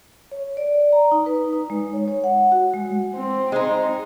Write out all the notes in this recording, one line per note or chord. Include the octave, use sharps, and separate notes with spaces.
C#5
D5
A#5
D#4
B4
D#4
G#3
C#5
C#5
F#5
F#4
G#3
C4
G#3 D#4